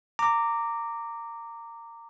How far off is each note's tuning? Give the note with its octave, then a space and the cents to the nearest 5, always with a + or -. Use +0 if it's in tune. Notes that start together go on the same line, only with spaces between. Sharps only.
A#5 -20 D6 +0